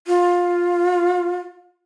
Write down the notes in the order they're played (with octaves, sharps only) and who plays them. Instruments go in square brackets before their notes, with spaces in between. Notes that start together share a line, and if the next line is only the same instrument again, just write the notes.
[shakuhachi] F4